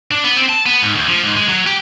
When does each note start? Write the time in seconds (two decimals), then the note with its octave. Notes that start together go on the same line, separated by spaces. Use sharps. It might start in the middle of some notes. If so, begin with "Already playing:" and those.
0.11 D4
0.24 B3
0.37 C4
0.49 A5
0.66 B3
0.83 G#2
0.96 D2
1.08 F3
1.24 G#2
1.36 G#3
1.49 F#3
1.67 G4